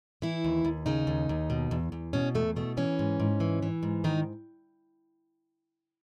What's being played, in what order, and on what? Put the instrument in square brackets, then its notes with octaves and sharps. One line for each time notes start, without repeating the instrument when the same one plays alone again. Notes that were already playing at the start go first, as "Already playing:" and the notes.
[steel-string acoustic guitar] E3 E4
D#2
D#2
C#3 D#4
D#2
D#2
B2
E2
E2
B2 C#4
E2 A3
B2 A3
E3 C#4
G#2
G#2
E3
E3
G#2
D#3 D#4